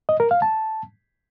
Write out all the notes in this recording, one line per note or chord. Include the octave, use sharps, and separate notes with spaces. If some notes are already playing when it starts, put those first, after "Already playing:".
D#5
A#4
F5
A5